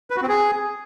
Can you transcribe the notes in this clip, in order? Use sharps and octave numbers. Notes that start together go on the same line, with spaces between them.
B4
F#4
C4
G#4